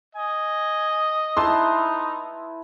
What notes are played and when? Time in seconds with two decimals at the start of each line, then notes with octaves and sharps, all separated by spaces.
0.15 D#5 G#5
1.37 D#4 E4 B4 A5 C6